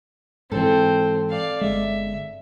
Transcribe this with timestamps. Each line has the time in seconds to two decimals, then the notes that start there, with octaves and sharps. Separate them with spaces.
0.52 G#2 E3 C4 A4
1.30 D5 F5
1.61 G1 G#3 E5